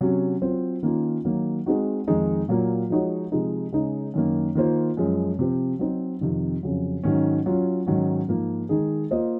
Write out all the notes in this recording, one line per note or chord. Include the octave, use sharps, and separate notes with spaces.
C3 F#3 C#4 F#4
F#3 C4 F4 C5
D#3 A#3 C#4 F4
D#3 F#3 A#3
G#3 C4 D#4 F#4
F2 D#3 G#3 D#4
A#2 F#3 A#3
F3 G#3 D#4 F#4 C#5
C3 F3 G#3 D#4
C#3 G#3 D#4
F#2 D#3 A#3
D#3 A#3 F4 C5
F#2 F3 G#3
C3 F3 C4
F#3 C4 D#4
F2 C3 D#3
F2 C#3 F#3
G#2 D#3 F#3 C#4
F#3 C#4 F4
G#2 D#3 F#3 C#4
G#2 F3 A#3
D#3 G#3 D#4 G#4
A#3 F4 C5 D#5